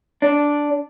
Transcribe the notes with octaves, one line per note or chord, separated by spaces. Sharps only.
D4